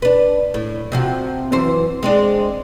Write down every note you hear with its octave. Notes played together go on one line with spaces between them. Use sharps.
D4 B4
A2
C3 F3 F#4
F#2 E3 C5
G#3 C4 D4